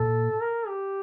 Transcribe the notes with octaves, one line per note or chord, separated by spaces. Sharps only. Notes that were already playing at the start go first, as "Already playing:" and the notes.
Already playing: A#2 A4
A#4
G4